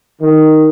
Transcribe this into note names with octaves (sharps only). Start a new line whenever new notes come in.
D#3